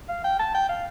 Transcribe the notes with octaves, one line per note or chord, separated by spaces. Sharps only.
F5
G5
A5
G5
F5